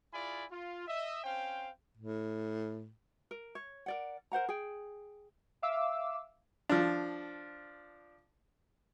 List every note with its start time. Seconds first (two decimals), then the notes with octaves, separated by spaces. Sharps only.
0.12 E4 F4 G#4 D5 G#5 B5
0.49 F4
0.86 D#5 E5
1.23 C4 C#4 C5 F5 G5
1.97 A2
3.31 A#4
3.55 C#5
3.86 A#4 D5 F#5
4.32 A#4 C5 F#5 A#5
4.49 G#4 G5
5.62 E5 F5 D6 E6
6.69 F3 D4